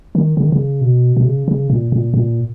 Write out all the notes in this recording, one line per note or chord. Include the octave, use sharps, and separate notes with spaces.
D#3
C#3
D#3
C#3
B2
B2
C#3
C#3
A#2
A#2
A#2